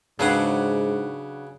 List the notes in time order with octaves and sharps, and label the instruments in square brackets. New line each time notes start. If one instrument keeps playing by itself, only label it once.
[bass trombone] G#2 [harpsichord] C#3 B4 F#5 [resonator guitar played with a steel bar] F#3 D4